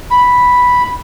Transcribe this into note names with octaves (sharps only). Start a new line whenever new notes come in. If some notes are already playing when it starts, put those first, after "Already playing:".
B5